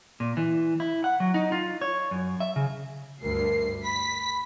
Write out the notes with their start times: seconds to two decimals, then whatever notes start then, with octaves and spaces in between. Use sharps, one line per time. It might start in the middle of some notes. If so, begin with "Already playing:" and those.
0.20 A#2
0.37 E3
0.80 E4
1.04 F#5
1.20 F#3
1.34 D#4
1.52 F4
1.81 C#5
2.11 F#2
2.40 E5
2.56 C#3
3.23 D2 G2 A#4 C7
3.84 B5 B6